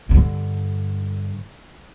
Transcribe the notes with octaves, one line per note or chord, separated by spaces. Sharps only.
G2 D3